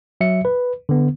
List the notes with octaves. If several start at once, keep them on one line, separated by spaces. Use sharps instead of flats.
F#3 E5 C#7
B4
D3 B3